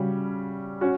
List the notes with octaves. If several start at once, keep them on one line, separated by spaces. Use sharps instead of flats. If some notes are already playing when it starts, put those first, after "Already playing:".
Already playing: C#3 G3 C#4 F#4
C#4 F#4